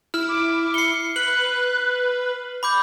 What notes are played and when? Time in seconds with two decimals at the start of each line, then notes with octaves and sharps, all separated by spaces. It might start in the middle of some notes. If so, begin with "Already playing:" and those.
0.14 E4 F6
0.29 D6
0.74 C7 C#7 G7
1.16 B4 F#6 F#7
2.63 B5 D6 G6